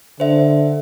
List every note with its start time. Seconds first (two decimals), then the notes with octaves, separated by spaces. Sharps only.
0.20 D3 C5 E5